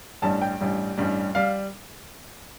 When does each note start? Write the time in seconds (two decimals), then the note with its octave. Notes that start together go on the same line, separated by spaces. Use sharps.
0.22 A1 G2 G3 A5
0.42 G5
0.61 A1 G2 G3
0.98 A1 G2 G3
1.35 G3 F5